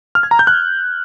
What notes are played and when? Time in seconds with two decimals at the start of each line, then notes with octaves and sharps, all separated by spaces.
0.15 F6
0.23 G#6
0.31 A#5
0.39 G6
0.47 F#6